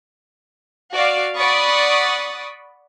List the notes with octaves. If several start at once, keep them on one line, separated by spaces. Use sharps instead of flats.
F#4 D5 F5
D5 F#5 B5 C#6 D#6 A6